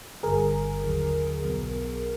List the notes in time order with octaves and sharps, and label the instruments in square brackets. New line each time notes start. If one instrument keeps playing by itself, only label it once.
[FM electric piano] G1 G2 D3 G#4 A#4
D#2 D3 F#3
B1 B2 F#3 B3